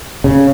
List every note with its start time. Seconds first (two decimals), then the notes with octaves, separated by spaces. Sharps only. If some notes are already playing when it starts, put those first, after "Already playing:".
0.24 C#3